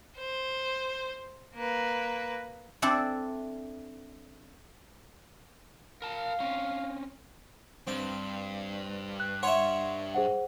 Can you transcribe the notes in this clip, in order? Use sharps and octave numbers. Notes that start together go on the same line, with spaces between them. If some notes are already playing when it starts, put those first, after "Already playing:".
C5
A#3 B4
C4 D4 E4 A4 C5
A#4 F5 A5
C4 C#4
G2 C4
F#6
C#5 E5 F#5 C6
G#4 C5 F#5